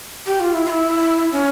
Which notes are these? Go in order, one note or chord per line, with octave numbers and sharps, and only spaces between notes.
G4
F4
E4
F4
E4
C#4